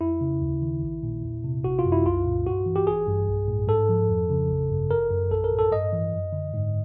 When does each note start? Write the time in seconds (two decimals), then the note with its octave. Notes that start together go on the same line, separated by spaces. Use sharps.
0.01 F2 E4
0.21 C#3
0.42 D#2
0.62 D#3
0.83 A#1
1.03 A#2
1.23 E2
1.44 C3
1.64 G#1 F#4
1.79 F4
1.85 F#2
1.92 E4
2.05 C2 F4
2.25 A#2
2.46 G2 F#4
2.66 E3
2.76 G4
2.87 A1 G#4
3.07 G2
3.27 B1
3.48 A2
3.68 G#2 A4
3.89 F3
4.09 F2
4.30 C#3
4.50 A1
4.70 G2
4.90 G#1 A#4
5.10 F#2
5.31 A#1 A4
5.44 A#4
5.51 A2
5.59 A4
5.71 G2 D#5
5.93 E3
6.13 F#2
6.32 D3
6.54 G#2